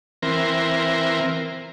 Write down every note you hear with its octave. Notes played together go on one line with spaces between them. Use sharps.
E3 C4 A#4